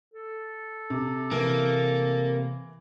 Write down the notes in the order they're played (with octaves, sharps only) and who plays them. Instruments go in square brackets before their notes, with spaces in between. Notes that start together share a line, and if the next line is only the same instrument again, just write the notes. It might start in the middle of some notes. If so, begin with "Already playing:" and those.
[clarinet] A4
[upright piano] C3
[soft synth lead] C3 [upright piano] E3 D7 [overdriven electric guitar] A#3